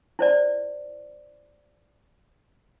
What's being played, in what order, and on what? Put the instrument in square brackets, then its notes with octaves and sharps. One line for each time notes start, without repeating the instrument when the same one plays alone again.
[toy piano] E4 C5 D5